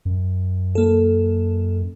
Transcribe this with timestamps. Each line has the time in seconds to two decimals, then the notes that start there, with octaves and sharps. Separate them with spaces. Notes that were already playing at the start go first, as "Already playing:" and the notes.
0.05 F#2
0.75 A#3 A4